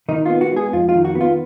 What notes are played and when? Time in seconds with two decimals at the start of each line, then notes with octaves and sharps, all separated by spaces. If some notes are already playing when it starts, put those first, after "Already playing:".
0.09 D#3 D#4
0.26 F4
0.30 B3
0.41 F#4
0.51 G#3
0.56 G#4
0.73 F2 F4
0.89 F4
0.95 D#3
1.05 F#4
1.15 B3
1.21 F4